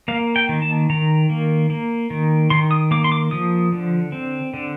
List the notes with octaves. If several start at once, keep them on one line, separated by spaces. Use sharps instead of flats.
A#3 F5
G5
D#3
A5
D#3 A#5
A#3
A#3
D#3
D#3 C6
D#6
A#3 D6
C6
D6
F3 D#6
D3
C4
D3